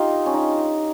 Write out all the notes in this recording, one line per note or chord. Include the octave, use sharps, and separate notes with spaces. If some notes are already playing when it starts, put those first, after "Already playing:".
Already playing: D#4 F4 G4
C#4
D#4